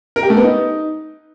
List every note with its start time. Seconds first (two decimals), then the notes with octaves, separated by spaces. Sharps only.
0.16 A#4
0.23 G4
0.30 A3
0.37 B3
0.44 D#4